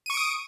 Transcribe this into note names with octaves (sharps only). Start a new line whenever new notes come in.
C#6 D#6 D7 D#7